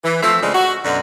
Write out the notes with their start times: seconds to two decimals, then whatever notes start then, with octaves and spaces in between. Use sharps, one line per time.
0.04 E3
0.22 F3 A3 C4 E5
0.42 C#3 G#3 C4 D4
0.54 F#4
0.85 F#2 B2 D3